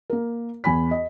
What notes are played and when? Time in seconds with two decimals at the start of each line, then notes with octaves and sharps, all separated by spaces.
0.10 A#3 A#4
0.64 E2 G#5 B5 B6
0.91 D#5